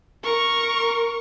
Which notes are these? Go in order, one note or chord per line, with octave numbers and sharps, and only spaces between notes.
A#4 C#6